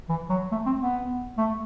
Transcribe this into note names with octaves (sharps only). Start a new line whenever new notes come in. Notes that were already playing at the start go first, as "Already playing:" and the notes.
E3
F#3
A3
C4
B3
A3